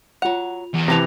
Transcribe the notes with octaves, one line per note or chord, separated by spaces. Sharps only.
F#3 F4 F#5 F7
E2
C3 E3 A4 A5 A#5 A#6 F7